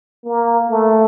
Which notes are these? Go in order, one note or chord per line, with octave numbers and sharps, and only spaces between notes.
A#3
A3